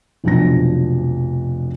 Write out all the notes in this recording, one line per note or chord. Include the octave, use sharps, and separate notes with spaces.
F1 B1 F3 D4 A#6